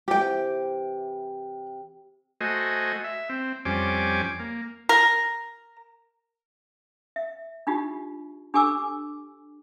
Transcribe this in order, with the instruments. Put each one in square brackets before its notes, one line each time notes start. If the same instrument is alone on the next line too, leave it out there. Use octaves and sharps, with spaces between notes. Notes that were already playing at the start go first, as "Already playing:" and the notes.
[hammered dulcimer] C3 E3 D6 [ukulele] G4 G5
[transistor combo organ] A3 F#4 C5 D#5 G#5
E5
C4
F2 G3 C#4 C5 G#5 D6
A#3
[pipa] A#4
[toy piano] E5
D4 D#4 F4 G4
D4 G4 A4 G#5 D6 E6